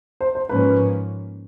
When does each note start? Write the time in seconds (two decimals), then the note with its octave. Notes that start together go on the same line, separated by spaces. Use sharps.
0.21 C5
0.35 C5
0.49 G#2 F3 A#3 C#4 B4